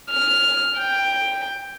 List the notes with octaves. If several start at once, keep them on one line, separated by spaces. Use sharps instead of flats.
F6
G5